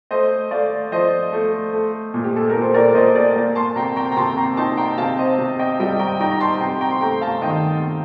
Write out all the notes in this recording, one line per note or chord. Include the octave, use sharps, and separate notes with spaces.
A3 C5 D#5
A3 D5 F5
F3 C5 D#5
A3
A3
A#2
G4
A4
A#2 A#4
C5
A#4 D5
A#2 C5 D#5
A#4 D5
A#3
A5 C6
C3 G5 A#5
G5 A#5
A#5
C3 A5 C6
G5 A#5
D#4 A5 C6
G5 A#5
C3 F5 A5
C5 D#5
C3
D#5 G5
G3 D#5 G5
G5 A#5
D#4 G5 A#5
A#5
A5 C6
C3 G5 A#5
G5 A#5
C6
A3 G5 A#5
F5 A5
D#3 D#5 G5